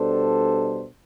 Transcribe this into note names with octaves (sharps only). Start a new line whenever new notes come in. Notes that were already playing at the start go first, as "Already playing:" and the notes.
Already playing: B2 G3 D4 A4 C5